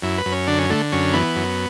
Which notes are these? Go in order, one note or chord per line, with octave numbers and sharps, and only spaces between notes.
F#2 E4
B4
F#2
C#4
D3 D4
C#4
D3 A3
F#2 C#4
E3 B3
F#2